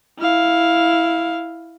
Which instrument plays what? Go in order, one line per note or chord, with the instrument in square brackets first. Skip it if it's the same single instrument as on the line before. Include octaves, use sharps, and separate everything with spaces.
[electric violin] E4 F5